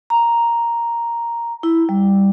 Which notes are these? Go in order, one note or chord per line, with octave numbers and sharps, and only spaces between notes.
A#5
E4
G3